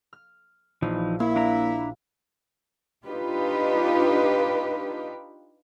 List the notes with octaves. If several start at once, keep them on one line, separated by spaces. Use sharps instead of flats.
F6
A#1 E3 F3 D#4
A#3 E4 F5
D4 E5 A#5
D4 D#4 F4 G4 B4